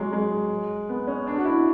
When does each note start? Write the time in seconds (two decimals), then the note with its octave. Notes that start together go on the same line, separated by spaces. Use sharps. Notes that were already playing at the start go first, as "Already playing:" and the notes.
Already playing: F#3 G#3
0.13 G#3
0.89 B3
1.07 C#4
1.27 D4
1.37 F#4
1.45 E4